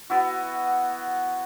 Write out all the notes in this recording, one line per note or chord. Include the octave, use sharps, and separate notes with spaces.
B3 E4 F#4